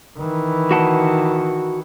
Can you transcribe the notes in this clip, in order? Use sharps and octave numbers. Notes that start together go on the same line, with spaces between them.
D#3 E3
F#4 F#5 A5